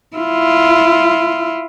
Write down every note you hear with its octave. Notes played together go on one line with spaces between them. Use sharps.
E4 F4